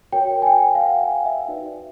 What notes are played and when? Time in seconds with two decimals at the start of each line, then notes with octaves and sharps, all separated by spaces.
0.12 F#4 A#4 C#5 G5
0.42 G#5
0.46 G5
0.75 F5
0.81 F#5
1.04 G#5
1.25 E5
1.48 D#4 F#4 B4 D5